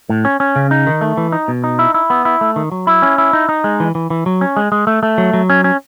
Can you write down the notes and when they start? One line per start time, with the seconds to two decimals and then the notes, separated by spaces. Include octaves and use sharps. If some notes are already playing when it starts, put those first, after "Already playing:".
0.09 A2
0.25 C#4
0.40 C#4
0.56 C#3
0.71 D#4
0.87 D#3
1.01 A3
1.17 E3
1.32 D#4
1.48 B2
1.64 D#4
1.79 E4
1.94 E4
2.10 B3
2.25 E4
2.41 A3
2.56 D#3
2.72 F#3
2.87 E4
3.02 C#4
3.18 E4
3.33 D#4
3.49 D#4
3.64 G#3
3.80 E3
3.95 E3
4.10 E3
4.26 F#3
4.41 C#4
4.57 G#3
4.72 G#3
4.87 A3
5.03 A3
5.18 F#3
5.34 F#3
5.50 C#4
5.64 C#4